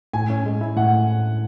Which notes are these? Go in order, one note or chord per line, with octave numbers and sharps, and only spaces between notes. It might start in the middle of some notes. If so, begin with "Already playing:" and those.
A2 G#5
C#4
G#3
E4
A2 F#5